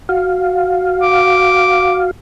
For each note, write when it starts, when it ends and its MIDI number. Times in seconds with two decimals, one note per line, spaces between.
0.09 2.11 66
0.09 2.11 77
1.03 2.00 86